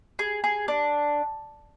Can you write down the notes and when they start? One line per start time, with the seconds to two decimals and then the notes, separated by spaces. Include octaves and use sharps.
0.19 G#4
0.44 G#4
0.68 D4